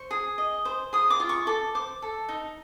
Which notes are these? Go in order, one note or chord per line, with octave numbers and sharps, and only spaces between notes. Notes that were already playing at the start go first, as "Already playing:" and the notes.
Already playing: C5 C#6
G#4
D#5
C5
G#4 D#6
D6
F4
C#6
A4 D6
C5 D6
A4
D#4